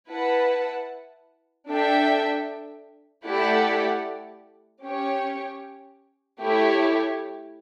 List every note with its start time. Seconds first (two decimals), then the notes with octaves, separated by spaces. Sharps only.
0.11 E4 B4 F#5 A5
1.68 D4 A4 E5 G5
3.26 A3 E4 G4 D5 F#5
4.84 C#4 G4 C#5 G5
6.41 A3 E4 G4 C#5